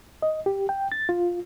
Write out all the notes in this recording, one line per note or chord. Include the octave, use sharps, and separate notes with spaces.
D#5
G4
G5
A6
F4